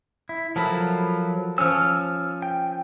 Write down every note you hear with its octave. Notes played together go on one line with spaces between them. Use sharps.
E4
F3 F#3 A4 A#4 B5
F3 C#4 E6 F6
G5